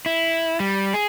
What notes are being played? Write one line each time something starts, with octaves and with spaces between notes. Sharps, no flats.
E4
G3
G#4